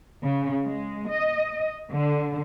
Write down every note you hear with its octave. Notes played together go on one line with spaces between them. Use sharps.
C#3
G#3
D#5
D3